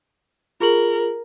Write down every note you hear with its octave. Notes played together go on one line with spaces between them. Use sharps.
F4 G#4 A#4 F#7